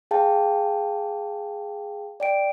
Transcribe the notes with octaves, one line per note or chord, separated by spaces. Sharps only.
G#4 F5 G5 A5
D5 G5 D7